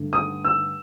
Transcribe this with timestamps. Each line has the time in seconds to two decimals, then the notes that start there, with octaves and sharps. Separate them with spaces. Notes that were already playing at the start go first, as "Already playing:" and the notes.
Already playing: G2 D3 A3
0.13 D#6
0.44 E6